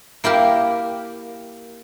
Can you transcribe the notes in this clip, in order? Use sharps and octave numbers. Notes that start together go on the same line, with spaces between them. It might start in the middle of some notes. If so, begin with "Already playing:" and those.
A#3 E4 G4 A#4